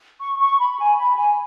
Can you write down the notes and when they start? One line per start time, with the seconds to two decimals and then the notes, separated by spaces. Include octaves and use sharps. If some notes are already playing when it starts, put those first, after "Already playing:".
0.21 C#6
0.40 C#6
0.59 B5
0.79 G#5
0.98 B5
1.17 G#5